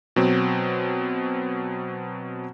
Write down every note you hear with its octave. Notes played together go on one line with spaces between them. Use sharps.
B2 F#3 C4